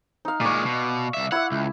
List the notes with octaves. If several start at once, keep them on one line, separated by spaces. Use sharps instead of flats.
D#4 F5
A#2 G#3 D5 C#6
B2
C2 E5
E4 E5 F#5
C#2